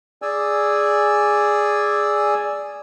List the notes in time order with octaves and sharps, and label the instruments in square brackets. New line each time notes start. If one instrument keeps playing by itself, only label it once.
[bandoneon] G#4 D5 G#5 E6